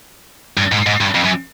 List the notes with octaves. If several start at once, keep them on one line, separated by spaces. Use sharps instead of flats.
G2
G#2
G#2
G2
F2
F#2